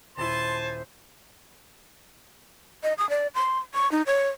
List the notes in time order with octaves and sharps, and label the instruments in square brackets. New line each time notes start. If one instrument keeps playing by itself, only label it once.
[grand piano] D#1 E4 [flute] C5 [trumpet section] G#5 A5 [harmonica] C6
[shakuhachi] D#5
D#6
D5
C6
C#6
D#4
C#5